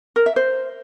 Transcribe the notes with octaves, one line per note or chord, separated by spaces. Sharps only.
A#4
E5
C5